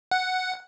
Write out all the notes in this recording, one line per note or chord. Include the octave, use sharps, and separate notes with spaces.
F#5